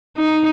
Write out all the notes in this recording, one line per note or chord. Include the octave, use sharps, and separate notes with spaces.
D#4